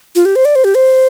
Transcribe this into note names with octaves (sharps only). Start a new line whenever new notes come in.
F4
G4
C5
D5
C5
G4
C5